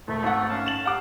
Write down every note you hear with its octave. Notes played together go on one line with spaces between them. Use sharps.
E1 A3
G#1 F#5
C#4 F5 A5
E7 F#7
G4 F5 F#5 D6